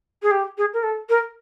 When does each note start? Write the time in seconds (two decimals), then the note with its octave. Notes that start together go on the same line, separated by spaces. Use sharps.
0.22 G#4
0.31 G4
0.58 G#4
0.74 A#4
0.83 A4
1.09 A#4